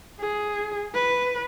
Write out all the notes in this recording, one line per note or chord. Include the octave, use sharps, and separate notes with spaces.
G#4
B4